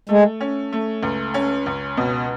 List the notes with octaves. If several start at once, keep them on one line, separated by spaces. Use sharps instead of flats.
G#3 A3
C#4
A3
C#2
C#4
C#2
B2